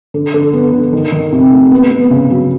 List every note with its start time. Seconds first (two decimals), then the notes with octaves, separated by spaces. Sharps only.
0.14 D3
0.34 D3
0.53 B3
0.73 D3
0.93 D#3
1.12 D#3
1.33 C3
1.52 A3
1.71 B3
1.91 B3
2.10 C#3
2.31 F#3